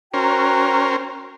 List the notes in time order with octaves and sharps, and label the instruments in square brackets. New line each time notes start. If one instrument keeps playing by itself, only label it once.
[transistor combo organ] C#4 A#4 C5 [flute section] F#4 G5 A#5